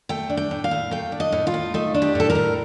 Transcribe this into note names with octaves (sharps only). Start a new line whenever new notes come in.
A3 G5
D4
G5
A2
F5
A2
A3 G5
D4
D#5
A2
F4
A2
A3 D#4
D4
G4
A2 A4
A#4
A2